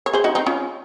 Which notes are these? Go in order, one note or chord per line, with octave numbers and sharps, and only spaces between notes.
C#5
G#4 C5
D#4 F#4
C4 D#4
C#4 F4